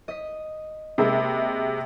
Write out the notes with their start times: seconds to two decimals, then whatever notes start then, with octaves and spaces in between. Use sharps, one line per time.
0.08 D#5 B6
0.98 C3 G#3 A#3 E5 B5